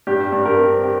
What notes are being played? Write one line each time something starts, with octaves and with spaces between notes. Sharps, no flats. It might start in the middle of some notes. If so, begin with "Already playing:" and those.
G2 G4
G2
G4 A#4
C4
G4